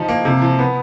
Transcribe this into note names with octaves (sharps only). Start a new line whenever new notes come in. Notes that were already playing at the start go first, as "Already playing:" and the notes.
Already playing: F3 D#4
A#3
C3
F3
B3